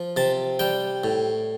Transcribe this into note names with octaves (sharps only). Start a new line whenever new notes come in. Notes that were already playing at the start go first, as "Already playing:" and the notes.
Already playing: F3
C3 A5
G3 G5
A2